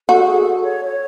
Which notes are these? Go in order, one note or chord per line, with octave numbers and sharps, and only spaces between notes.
F#4 A4
G#4
A4
C#5
C#5